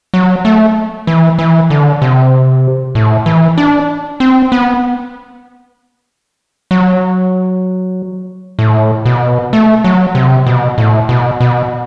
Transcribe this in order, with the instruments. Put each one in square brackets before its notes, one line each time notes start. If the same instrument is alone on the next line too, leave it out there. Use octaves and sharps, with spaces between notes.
[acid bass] F#3
A3
E3
E3
D3
C3
A2
E3
D4
C4
B3
F#3
A2
B2
A3
F#3
C3
B2
A2
B2
B2